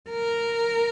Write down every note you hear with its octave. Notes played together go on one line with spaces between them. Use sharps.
A#4